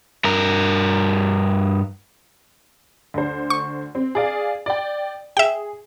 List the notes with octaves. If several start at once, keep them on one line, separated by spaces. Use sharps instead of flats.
G2 A#4
D2 C5
C#6
C4
G#4 D5 F5
D5 G5
G#4 E5 G5